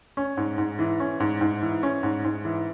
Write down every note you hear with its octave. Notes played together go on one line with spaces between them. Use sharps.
C#4
G#2
G#2
E3
C#4
G#2
G#2
E3
C#4
G#2
G#2
E3